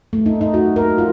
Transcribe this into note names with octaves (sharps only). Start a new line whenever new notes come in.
A3
D#4
D#4
F#4
A#4
F4